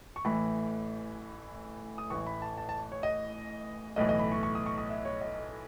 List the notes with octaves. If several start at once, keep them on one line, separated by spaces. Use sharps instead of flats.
C#6
A1 A2 E3 B5
D#6
A1 A2 E3 C#6
B5
A5
A5
A5
C#5
D#5
B1 A2 E3 D#5
D#5
B5
C#6
C#6
D#6
C#6
D#6
E5
C#5
D#5